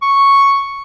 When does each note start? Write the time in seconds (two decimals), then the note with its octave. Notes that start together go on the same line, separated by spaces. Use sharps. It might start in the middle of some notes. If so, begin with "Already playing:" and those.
0.02 C#6